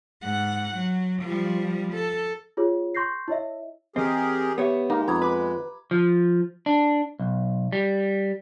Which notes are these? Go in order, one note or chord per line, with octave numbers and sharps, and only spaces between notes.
G#2 F#5
F#3
F3 G3
A4
F4 G#4 C#5
C6 C#6 G6 A#6 C7
E4 C#5 D#5 E5
E3 C4 G4 G#4 A#4 D#5
B3 G4 C#5 E5
G#3 A#3 D#4
F2 B3 A#5 G#6
B4 B5 D6
F3
D4
B1
G3